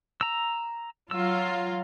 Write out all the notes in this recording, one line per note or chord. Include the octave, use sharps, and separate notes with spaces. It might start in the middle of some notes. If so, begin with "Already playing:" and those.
A#5 E6
F#3 F4 E6